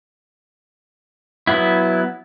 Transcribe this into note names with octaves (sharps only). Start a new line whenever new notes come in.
F#3 B3 E4